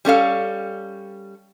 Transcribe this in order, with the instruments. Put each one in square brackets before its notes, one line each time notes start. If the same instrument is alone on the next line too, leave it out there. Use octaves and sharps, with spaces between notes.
[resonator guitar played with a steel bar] G3 C#4 A4 F5